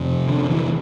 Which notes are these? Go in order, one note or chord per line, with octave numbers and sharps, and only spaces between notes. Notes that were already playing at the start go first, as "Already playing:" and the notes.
Already playing: F2 C3
D3
E3